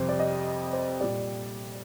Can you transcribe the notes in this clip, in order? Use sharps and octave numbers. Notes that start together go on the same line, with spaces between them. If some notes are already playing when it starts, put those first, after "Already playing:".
Already playing: F2 C3 G3 C5
D5
D#5
C5
A#2 G3 D5